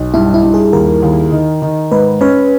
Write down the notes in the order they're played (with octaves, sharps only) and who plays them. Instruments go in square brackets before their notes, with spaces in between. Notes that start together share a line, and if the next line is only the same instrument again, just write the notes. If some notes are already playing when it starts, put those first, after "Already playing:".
Already playing: [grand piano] B1
[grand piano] G2 [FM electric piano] E4
[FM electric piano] E4
[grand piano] G2
[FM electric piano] G#4
[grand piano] D#2 [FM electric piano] A#4
[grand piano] D#2
D#3
D#3
[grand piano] G#2 [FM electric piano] B4
[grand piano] C#4 [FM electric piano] B4